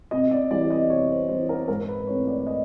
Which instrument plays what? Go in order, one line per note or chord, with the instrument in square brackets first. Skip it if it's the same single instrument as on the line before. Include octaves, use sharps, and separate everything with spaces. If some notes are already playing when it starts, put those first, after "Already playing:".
[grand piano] C3 D#5
D5
E3 G3 D5
D#5
C3 C#5
C5
E3 G3 C5
A#4
G#2 A#4
B4
E3 A3 C4 C#5
D5
D#5